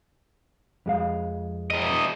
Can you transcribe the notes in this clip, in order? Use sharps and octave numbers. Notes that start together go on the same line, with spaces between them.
F2 G#3 F5
E2 D#5